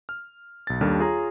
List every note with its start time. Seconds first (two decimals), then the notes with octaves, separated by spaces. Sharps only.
0.09 F6
0.67 B1 A6
0.81 D#2 D#3 G3 D4 A4 F6
1.00 F4 G#4 C#5 A#5